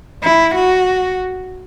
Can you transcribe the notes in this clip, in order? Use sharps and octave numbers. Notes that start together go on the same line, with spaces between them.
E4
F#4